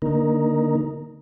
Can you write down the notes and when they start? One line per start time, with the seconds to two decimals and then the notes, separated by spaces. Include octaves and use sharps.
0.02 D3 A#3 D#4 A#4